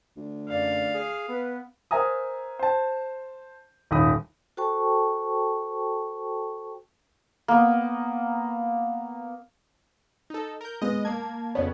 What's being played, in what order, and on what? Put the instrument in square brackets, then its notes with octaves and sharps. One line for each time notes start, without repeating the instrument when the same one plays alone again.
[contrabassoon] D2
[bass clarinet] F#2 [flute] D5 [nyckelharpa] F5
[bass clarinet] G#4
[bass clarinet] B3 [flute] B4
[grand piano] A#4 C5 E5 G#5 A#5 D#6
C5 A5
D#1 G#2 B5 D#6
[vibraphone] F#4 A4 C5 G5 A5 C#6
[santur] A#3 B3
[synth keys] D#4 A4
A#4 G6
[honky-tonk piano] G#3 B3 [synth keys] D#5
[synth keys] A#3 G#6 [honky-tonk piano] A5
[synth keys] F2 C#3 B3 [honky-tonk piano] C#5